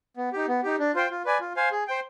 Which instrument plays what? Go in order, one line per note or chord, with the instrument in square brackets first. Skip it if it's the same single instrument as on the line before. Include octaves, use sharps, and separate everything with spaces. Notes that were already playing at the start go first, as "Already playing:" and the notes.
[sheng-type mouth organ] B3
D#4 G4
B3
D#4 G4
D4
F4 C5 G5
F4
B4 D5 G#5
F4
C5 F5 G#5
G#4
C5 G5